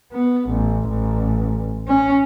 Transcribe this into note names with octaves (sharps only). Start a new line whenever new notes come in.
B3
A1
A1
C#4